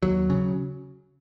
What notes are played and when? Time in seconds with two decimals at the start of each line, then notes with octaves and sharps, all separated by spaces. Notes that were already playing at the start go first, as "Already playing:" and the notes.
0.03 D#2 F#3
0.30 C#3